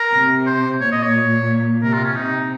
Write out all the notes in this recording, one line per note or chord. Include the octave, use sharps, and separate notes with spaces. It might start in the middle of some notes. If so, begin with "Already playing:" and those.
Already playing: A#4
C3
C5
A#2 C#5
D#5
C#5
C3 A#4
F4
C#4
C3 D#4